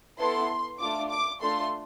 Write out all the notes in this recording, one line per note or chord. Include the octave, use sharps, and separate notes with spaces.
B3 E4 A4 C6
A3 D4 F4 D6
D6
A3 D4 F4 A4 C6